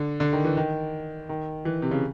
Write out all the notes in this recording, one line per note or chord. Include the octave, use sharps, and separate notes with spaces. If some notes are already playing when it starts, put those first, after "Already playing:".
Already playing: D3
D3
D#3
E3
D#3
D#3
E3
C3
C#3